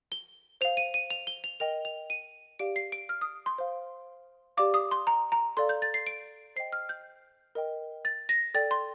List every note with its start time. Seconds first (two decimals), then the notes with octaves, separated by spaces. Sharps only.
0.12 G7
0.61 C5 F5 F7
0.77 D#7
0.94 D#7
1.10 F7
1.27 G7
1.44 F7
1.60 A#4 D#5 G5 F7
1.85 F7
2.10 D#7
2.59 G4 D5 F5 D7
2.76 C7
2.92 D7
3.09 F6
3.21 D#6
3.46 C6
3.58 C5 F5
4.57 G4 D5 F5 D6
4.74 D#6
4.91 C6
5.07 A#5
5.32 A#5
5.57 A4 D5 F5 C6
5.69 G6
5.82 A6
5.94 C7
6.07 D7
6.56 C5 D#5 G5 C7
6.72 F6
6.89 G6
7.55 A#4 D#5 G5
8.05 A6
8.29 A#6
8.54 A4 D5 G5 A6
8.71 C6